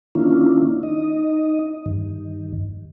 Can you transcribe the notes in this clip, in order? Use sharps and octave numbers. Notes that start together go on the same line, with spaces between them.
D#3 A#3 C#4 D4 E4 F4
D#4 D#5
G2 D#3